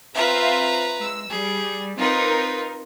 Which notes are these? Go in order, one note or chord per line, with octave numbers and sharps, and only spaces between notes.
C4 F4 B4 E5 A#5
G#3 E6
G3 G#4
C4 D#4 F4 A#4 B4